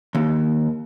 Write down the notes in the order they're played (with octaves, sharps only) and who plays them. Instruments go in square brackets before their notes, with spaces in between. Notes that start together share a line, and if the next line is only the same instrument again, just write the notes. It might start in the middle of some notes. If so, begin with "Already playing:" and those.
[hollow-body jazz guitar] D#2